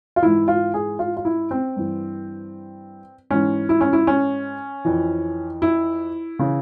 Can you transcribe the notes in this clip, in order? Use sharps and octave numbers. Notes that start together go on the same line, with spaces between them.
F4
G#2 E3 E4
F4
G#4
F4
F4
E4
C4
G2 E3
G#2 E3 C#4
E4
C#4
E4
C#4
F2 E3
E4
C#3 E3